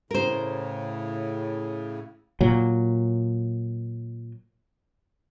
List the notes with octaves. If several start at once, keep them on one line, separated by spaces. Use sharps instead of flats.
A2 C#3 A#4 C5
A#2 F#3